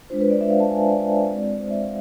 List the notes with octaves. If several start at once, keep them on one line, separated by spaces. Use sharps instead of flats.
G#3 D4 F4 C5
B4
D5
E5
F5
A5
G#5
E5
D5
G#3 C4 F4
C5
E5
F5